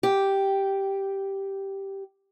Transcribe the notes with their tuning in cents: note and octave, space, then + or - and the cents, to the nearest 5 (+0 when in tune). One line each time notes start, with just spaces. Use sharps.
G4 -5